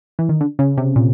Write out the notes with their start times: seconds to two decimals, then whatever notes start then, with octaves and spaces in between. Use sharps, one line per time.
0.19 E3
0.29 D#3
0.41 D3
0.59 C#3
0.77 C3
0.96 A#2